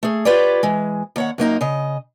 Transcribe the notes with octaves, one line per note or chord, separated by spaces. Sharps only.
A3 G#4
F4 G4 B4 C#5 D5
E3 G#3
D#2 C#5 F#5
F#2 A#3 D#4 A#5
C#3 D#5